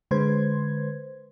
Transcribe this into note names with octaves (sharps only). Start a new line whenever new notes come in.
D3 G#3 B4 C5 C6 G#6